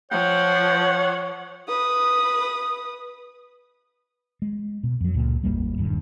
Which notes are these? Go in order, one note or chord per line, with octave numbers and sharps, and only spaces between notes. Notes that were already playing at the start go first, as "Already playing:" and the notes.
F3 C#5 F#5 G5
B4 D#6
G#3
B2
F2 F#3
C#2 A#2
G#1 E2 G3 A#3
D#1 G2 D#3